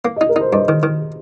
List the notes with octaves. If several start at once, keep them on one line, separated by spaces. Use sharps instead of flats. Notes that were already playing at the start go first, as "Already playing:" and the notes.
A#3
D#5
D#4
A#4
D#4 C5
G2 D#5
D#3
D#3